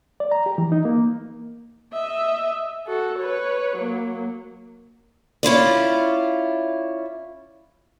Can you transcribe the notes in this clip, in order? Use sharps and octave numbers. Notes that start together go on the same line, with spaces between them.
D5
A#5
G4
E3
D#4
A#3
D#5 E5
F#4 A4
B4 C#5
F#3 A#3
C#4 E4 F4 D5